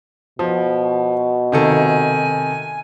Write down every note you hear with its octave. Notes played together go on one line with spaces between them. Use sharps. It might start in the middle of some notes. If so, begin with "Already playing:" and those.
B2 F3
C3 D#3 A4 G#5